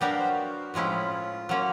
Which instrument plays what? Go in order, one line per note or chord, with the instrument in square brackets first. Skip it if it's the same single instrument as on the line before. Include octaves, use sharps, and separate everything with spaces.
[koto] F#3 B3 D4 G4 A#4 [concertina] G5
[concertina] F5
C5
F#4
[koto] A2 F3 G#3 C#4 E4 [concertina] F4
[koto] F#3 A#3 C#4 [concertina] F#4